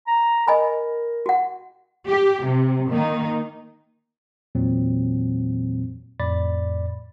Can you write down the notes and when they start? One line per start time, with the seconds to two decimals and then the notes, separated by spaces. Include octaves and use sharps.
0.07 A#5
0.48 A#4 D#5 G#5 B5
1.26 F#4 F#5
2.08 G4
2.45 C3
2.90 D#3 A#3 D#4
4.55 E2 A#2 E3 F#3 C4
6.20 F2 A2 D5 B5 A6